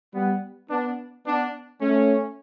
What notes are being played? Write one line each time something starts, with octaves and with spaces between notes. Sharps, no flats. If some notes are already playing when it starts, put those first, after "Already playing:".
G3 B3
B3 D4
B3 D4
A3 C#4